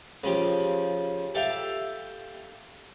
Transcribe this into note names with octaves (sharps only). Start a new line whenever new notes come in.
C#3 F3 G4
G4 A4 E5 F5 G5 A5